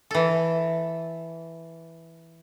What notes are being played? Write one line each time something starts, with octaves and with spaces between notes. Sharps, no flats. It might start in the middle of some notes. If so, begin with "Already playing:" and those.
E3 A4